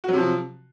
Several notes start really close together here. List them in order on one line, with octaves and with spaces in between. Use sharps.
F#4 F#3 C3 F3